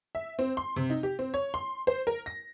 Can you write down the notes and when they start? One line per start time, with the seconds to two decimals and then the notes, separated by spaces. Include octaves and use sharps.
0.15 E5
0.39 C4
0.57 C6
0.76 C3
0.90 D#4
1.03 G4
1.19 C4
1.34 C#5
1.54 C6
1.87 C5
2.07 A#4
2.26 A#6